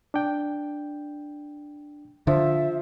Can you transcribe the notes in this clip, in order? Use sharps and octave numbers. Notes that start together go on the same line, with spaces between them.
D4 G5
D3 F3 E5